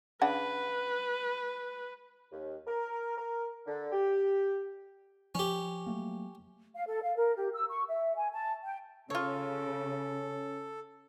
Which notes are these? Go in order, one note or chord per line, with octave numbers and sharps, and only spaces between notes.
C#3 D4 B4 F#5
D#2
A#4
A#4
D3
G4
F3 C#4 G4
F#3 A3 A#3
F5
A4
F5
A#4
G4
E6
C#6
E5
G#5
A5
G5
C#3 C#4 F4 A4 C#5